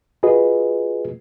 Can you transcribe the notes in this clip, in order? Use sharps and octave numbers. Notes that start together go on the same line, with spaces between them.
F4 F#4 G#4 B4 D#5